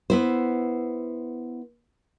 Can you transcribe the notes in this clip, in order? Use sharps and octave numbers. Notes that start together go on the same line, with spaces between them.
B3 E4 C5